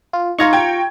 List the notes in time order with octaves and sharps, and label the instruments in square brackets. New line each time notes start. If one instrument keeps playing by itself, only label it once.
[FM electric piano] F4
[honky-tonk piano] D#4 G#6 [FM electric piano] F4 A#5 C#6
[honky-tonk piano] G5 G#6